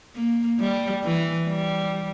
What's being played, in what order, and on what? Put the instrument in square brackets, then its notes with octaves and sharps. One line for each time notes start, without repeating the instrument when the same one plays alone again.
[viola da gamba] A#3
G3
E3
G3